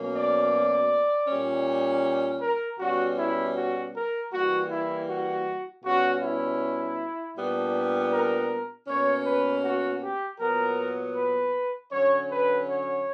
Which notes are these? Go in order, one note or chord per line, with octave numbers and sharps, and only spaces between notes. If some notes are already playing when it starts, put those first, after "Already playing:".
Already playing: B2 F#3 A#3 C#4
D5
A#2 G3 C#4
A#4
B2 G3 C#4 F#4
E4
F#4
A#4
E3 G3 A#3 F#4
E4
F#4
B2 G3 C#4 F#4
E4
A#2 G3 B3 D4
A#4
B2 A#3 C#4 C#5
B4
F#4
G4
A#2 F#3 B3 A#4
B4
D3 F#3 C#4 C#5
B4
C#5